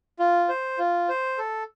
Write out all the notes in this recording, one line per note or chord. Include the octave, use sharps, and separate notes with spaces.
F4
C5
F4
C5
A4